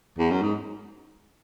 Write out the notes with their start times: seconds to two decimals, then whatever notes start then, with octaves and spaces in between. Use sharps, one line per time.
0.18 E2
0.30 F#2
0.42 G#2